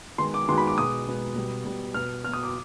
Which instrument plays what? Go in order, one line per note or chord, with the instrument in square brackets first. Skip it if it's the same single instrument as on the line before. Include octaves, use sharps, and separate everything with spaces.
[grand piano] D#3 G#3 B3 C6
D6
D#3 G#3 B3 C6
B5
D6
B2 G#3 B3 D#6
B2 G#3 B3
B2 G3 B3
B2 G3 B3
B2 B3 F6
B3 F6
B2
D#6
D6